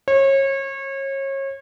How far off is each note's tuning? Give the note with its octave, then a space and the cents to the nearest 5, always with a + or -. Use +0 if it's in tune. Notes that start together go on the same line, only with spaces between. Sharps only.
C#5 -30